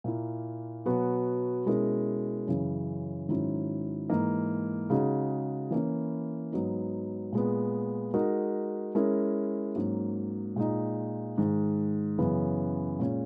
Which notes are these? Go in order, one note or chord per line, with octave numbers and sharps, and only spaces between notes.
A#2 A#3 E4
B2 F#3 B3 F#4
B2 G#3 C#4 E4 A#4
F#2 C#3 E3
G#2 D#3 F#3 C#4 E4
G#2 E3 A#3 D#4
C#3 G#3 D#4 F#4
E3 A#3 C#4 E4
G#2 F#3 B3 D#4
A#2 G#3 B3
G#3 D#4 F#4 A#4
G#3 C#4 E4 A#4
G#2 F#3 A#3 C#4
A#2 G#3 D#4
G#2 D#3 G#3
F#2 C#3 E3 B3
A#2 G#3 C#4